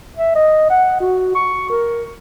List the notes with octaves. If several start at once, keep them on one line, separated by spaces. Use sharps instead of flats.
E5
D#5
F#5
F#4
C#6
A#4